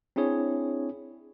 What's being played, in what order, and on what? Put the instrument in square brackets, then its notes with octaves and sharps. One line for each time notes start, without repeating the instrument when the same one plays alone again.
[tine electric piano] C4 D4 E4 G#4 C#5